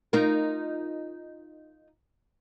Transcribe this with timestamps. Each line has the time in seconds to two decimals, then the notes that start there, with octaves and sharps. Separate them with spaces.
0.13 D#4 F4 A#4